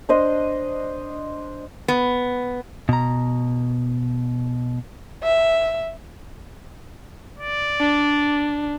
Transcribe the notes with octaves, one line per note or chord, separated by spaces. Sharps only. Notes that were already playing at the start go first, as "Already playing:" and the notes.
D4 C5 D#5
B3
B2 A#5
E5
D5
D4